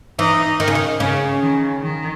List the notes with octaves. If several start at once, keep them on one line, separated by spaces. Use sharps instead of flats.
E3 D#4
D#3
C#3
D#3
C#3 C#4
D#3
D#3